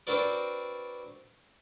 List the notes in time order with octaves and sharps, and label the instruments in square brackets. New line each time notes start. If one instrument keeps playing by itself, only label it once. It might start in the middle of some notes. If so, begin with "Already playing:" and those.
[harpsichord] C4 D4 F#4 A#4 B4 D5